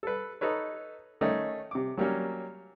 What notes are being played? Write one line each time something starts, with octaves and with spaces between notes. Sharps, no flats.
A4 B4
D#4 A4 B4 C#5
D#3 A3 C#4 D#4
C3 D6
F#3 G3 A#3 C#4